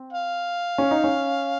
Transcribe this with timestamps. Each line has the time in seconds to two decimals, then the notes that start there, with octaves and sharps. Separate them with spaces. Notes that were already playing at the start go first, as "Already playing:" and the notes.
Already playing: C4
0.13 F5
0.78 C#4
0.91 D#4
1.04 C#4